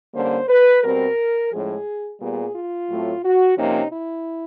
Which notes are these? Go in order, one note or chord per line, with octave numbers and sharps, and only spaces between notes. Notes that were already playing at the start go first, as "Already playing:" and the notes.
D3 G3 A#3 C#4 C5
B4
B2 G3 C4 A#4
A2 F3 G#3 C#4 G#4
A#2 G3 B3 G#4
F4
A2 F#3 A3 C4
F#4
C3 F3 A#3 C#4 D#4
E4